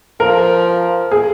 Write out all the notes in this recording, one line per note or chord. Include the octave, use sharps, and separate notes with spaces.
F3 A#4
G#4